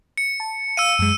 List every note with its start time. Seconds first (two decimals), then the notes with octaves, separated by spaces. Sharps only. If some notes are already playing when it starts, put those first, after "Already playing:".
0.18 C#7
0.40 A5
0.77 F5 E6 C#7 D#7
0.99 F#2 G#3